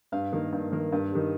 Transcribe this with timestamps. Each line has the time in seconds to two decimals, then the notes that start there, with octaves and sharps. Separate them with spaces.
0.12 G2 F5
0.32 D#3 A#3
0.52 G2
0.72 D#3 A#3
0.92 G2
1.11 D#3 G3